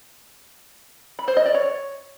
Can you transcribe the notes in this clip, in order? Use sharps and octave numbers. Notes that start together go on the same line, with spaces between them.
B5
C5
D#5
D5
C#5